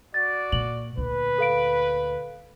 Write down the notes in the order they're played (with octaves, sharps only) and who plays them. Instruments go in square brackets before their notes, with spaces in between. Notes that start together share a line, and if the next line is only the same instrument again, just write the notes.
[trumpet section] F#4 D5 [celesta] A6
[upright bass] A#2 [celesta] F#7
[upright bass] D2 A#2 [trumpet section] B4
[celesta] A4 F5 D7